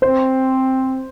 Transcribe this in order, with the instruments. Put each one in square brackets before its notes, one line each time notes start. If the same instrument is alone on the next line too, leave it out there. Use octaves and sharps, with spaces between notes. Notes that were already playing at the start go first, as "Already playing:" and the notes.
[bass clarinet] C4 [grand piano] C5